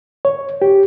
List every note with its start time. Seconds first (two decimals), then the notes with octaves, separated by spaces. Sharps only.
0.25 C#5
0.62 G4